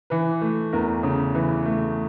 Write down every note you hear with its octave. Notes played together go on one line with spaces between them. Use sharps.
E3 B4
A3
E2 A#4
C#3
E3 B4
A3